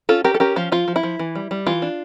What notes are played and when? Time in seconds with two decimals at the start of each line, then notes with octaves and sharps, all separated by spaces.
0.09 C#4 F4 A4
0.24 C#4 G4 A#4
0.34 A4
0.40 C#4 G4 A#4
0.56 F3 F4
0.72 F3 F4
0.88 F3
0.96 E4
1.03 F3
1.19 E3
1.35 G3
1.51 G3
1.67 E3 F4
1.82 D4